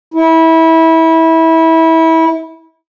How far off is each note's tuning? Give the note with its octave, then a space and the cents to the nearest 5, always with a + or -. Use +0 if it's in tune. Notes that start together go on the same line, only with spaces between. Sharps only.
E4 -25